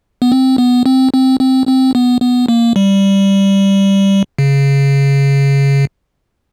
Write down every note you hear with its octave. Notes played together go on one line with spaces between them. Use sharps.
B3
C4
B3
C4
C4
C4
C4
B3
B3
A#3
G3
C#3